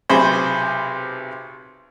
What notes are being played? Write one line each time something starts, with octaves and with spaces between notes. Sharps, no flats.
B1 C3 G#4 C5 B5